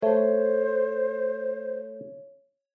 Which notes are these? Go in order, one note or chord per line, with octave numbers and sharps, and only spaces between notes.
A3 C5 C#5